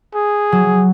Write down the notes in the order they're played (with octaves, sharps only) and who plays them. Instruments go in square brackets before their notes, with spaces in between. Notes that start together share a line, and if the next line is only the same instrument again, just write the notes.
[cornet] G#4
[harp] F#3